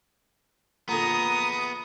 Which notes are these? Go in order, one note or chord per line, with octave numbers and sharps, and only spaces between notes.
A#2 D3 B3 G#4 A#5 D#6